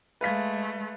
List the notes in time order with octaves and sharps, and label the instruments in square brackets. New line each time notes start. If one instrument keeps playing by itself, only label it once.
[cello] G#3 A3 [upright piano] B4 F5 B6